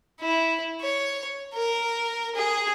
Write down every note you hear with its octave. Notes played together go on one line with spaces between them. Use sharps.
E4
C#5
A#4
G#4